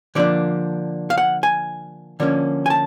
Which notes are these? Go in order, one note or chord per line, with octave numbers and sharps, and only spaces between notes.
D3 F3 A#3 D4 D5
F5
F#5
G#5
D3 F3 A#3 C#4
G#5
A5